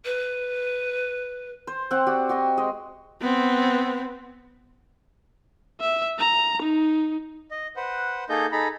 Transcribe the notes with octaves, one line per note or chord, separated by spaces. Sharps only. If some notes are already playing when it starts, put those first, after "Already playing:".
B4
C5
C4 F#5
F#4 G4 D5
F#4 G4 D#5 G#5
G#3 D#5
B3 C4
E5
A#5
D#4
D#5
B4 C5 F#5
A#3 D#4 G#4 A4 D#5 G6
D#4 G#4 A4 A#5 B5